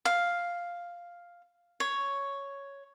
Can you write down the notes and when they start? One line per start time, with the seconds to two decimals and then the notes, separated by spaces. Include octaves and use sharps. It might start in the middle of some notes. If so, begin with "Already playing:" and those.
0.05 F5
1.80 C#5